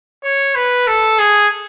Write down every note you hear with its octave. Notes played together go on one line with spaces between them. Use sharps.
C#5
B4
A4
G#4